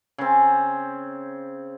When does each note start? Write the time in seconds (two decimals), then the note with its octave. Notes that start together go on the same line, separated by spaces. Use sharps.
0.18 C#3 C4